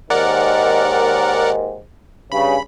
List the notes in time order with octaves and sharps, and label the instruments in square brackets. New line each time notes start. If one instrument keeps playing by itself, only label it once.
[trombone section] D#2 G#2 D#3 [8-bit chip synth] A#4 D5 F#5
[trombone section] G2 C#3 [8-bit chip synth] B5